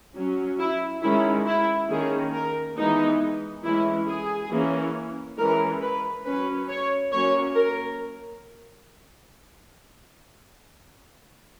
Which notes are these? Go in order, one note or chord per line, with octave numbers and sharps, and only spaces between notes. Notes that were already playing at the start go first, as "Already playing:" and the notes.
F#3 C#4
E4
D#3 G#3 C#4 E4
E4
D#3 A#3 C#4 G#4
A#4
E3 G#3 B3 D#4
E3 G#3 C#4 E4
G#4
E3 A#3 C#4
E3 G#3 C#4 A#4
B4
F#3 C#4 B4
C#5
F#3 A#3 C#4 C#5
A#4